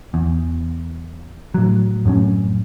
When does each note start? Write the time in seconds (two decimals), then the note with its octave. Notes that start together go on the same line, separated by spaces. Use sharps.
0.14 E2
1.54 A2 F#3
2.05 F#2 A2 F#3 C#4